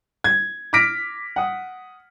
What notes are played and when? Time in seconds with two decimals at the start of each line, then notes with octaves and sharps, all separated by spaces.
0.24 G#6
0.73 D6 F6 A#6 B6 D7
1.36 F#5 D#6